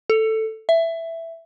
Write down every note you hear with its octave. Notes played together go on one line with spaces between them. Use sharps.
A4
E5